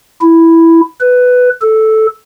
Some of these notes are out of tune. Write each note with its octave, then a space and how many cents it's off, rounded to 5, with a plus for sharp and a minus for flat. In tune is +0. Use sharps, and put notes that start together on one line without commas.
E4 +0
B4 +10
A4 -5